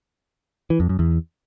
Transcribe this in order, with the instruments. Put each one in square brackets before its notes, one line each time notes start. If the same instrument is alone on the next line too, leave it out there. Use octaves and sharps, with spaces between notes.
[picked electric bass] E3
F2
F#2
E2